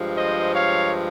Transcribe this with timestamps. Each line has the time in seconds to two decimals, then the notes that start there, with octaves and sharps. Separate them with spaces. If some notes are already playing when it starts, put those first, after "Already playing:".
Already playing: G2 F3 G#3
0.16 C5 D#5
0.53 C#5 F5